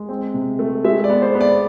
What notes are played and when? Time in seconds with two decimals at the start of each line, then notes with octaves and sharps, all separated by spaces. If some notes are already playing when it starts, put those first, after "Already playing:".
Already playing: G#3
0.09 C4
0.34 C3
0.59 A3
0.84 G#3 E5
1.04 D5
1.10 B3
1.22 C5
1.35 B3
1.41 D5